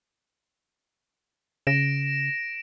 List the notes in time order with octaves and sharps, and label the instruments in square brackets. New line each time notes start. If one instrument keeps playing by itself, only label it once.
[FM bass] C#3 [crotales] A#6 D7 E7